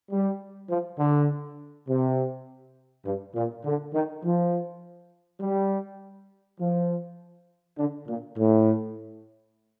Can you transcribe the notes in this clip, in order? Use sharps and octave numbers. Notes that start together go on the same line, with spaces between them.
G3
F3
D3
C3
G2
A#2
D3
D#3
F3
G3
F3
D3
A#2
A2